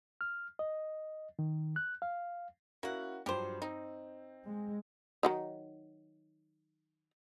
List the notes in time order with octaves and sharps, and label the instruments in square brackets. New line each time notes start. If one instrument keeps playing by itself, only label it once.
[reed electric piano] F6
D#5
D#3
F#6
F5
[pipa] A#3 F#5 [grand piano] C#4 E4 F#4
[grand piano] G2 F3 F#3 [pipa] G4 C5
[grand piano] C4 [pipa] D#4
[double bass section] G#3
[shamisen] D#3 F#3 D#4